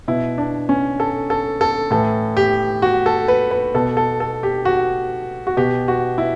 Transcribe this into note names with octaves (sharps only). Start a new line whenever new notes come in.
B2 E4
D4
C#4
A4
A4
A4
A2 E3 A4
G4
F#4
A4
B4
B4
B2 A4
A4
A4
G4
F#4
F#4
B2 G4
F#4
E4